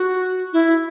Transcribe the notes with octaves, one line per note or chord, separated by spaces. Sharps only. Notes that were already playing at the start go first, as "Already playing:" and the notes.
Already playing: F#4
E4